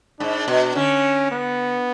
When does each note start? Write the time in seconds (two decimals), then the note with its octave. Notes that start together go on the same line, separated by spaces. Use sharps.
0.20 G#2 D4
0.48 B2
0.75 D3 C#4
1.31 B3